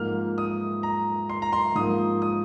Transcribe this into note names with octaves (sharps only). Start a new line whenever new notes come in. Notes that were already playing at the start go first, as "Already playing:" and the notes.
Already playing: G#2 F3 A#3 F6
D#6
A#5
C6
A#5
C6
G#2 F3 A#3 D#6
D#6